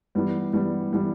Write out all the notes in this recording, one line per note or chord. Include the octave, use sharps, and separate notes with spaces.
E3 G3 B3
E3 G3 B3
E3 G3 B3